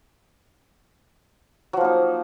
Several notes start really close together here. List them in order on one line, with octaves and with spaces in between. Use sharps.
F#3 F3 A#3 D#4